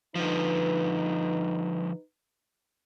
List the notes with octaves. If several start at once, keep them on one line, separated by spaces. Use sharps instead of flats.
D3 F3 D#4 B4